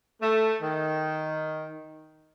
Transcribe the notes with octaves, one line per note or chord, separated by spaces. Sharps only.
A3
D#3